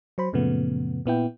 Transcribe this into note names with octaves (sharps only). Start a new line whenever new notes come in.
F#3 C5 B5
F#2 A#2 C#3 F3 A3 B3
A#2 B3 E4 G5